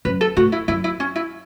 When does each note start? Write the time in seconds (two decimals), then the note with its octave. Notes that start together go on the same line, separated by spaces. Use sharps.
0.05 F#2 B4
0.21 A4
0.37 A2 F#4
0.52 E4
0.68 F#2 E4
0.84 E4
1.00 C#4
1.16 E4